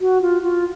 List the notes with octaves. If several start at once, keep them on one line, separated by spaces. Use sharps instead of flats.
F#4
F4
F4